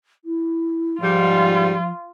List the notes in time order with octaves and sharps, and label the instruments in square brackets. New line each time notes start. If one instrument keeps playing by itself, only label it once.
[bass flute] E4
[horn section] G#2 G3 [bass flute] F3 [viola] F4